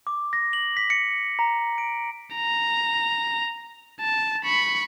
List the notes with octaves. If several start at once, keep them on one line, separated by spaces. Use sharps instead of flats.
D6
A#6
F#7
B6
C#7
A#5
D7
A#5
A5
B5 C#6